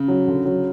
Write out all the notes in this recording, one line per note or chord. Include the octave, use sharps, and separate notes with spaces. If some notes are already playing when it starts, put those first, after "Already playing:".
Already playing: C#3
F#3
D3
F#3